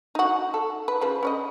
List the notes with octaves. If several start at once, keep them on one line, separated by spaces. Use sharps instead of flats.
D#4 F#4
A4
B4
C#3 F3 B4
C#4 D5 D#5